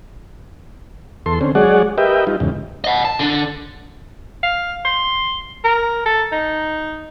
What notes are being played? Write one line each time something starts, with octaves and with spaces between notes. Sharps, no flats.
E2 A4 C6
D3 C4 C#4
F#3 G#3 G#4 C#5 D5 F#5
G4 A#4 B4 D#5 E5 G5
G3 D#4 F4
E2 G#2 C#3
D#5 F#5
A5
D3 D4
F5
C6
A#4
A4
D#4